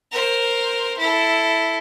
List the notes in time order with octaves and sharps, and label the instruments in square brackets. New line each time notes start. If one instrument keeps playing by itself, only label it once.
[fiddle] A#4 C5
E4 A4